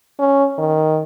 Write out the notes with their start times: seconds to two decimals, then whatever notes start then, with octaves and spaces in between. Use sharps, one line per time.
0.20 C#4
0.58 D#3